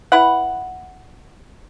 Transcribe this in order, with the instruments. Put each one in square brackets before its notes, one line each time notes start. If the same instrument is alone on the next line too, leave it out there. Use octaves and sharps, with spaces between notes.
[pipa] E4 B4 F#5